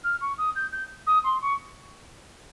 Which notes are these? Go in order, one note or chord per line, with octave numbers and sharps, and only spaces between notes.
F6
C#6
D#6
G6
G6
D#6
C6
C#6